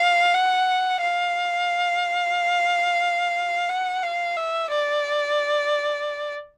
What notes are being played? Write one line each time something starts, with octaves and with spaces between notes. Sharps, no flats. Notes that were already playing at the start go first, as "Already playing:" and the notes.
Already playing: F5
F#5
F5
F#5
F5
E5
D5